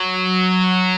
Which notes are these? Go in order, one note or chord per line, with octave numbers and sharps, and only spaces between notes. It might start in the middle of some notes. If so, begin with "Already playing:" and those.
Already playing: F#3